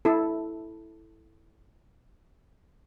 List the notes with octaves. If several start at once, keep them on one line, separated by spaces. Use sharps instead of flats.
E4 A4